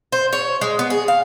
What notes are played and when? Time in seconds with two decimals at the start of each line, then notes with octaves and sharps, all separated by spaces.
0.12 C5
0.33 C#5
0.61 G#3
0.79 B3
0.90 G#4
1.08 F5